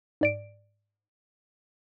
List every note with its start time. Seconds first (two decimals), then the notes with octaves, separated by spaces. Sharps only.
0.21 G#2 D5 D7